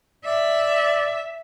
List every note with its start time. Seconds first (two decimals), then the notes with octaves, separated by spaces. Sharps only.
0.25 D5 E5